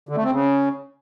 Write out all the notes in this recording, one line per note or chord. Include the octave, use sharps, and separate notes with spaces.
D3
A3
C4
C#3